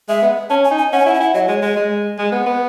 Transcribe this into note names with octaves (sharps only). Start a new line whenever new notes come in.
G#3 E5
B3
C#4 A5
G#5
D#4
G#5
C#4 F#5
G#5
E4 F#5
G#5
E4 F#5
F#3 D#5
G#3 C#5
G#3 D#5
G#3
G#3
B3
B3